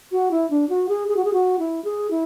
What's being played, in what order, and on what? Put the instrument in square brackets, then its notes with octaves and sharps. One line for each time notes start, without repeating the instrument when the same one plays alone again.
[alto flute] F#4
E4
D4
F#4
G#4
G#4
F#4
G#4
F#4
E4
G#4
E4